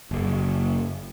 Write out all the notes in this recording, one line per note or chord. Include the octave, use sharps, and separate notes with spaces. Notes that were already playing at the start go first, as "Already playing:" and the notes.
F#1